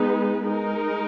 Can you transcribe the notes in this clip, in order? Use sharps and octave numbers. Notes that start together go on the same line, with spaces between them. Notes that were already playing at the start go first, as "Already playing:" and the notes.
Already playing: G#3 B3 D#4 G#4 B4
G#3 D#4 A#4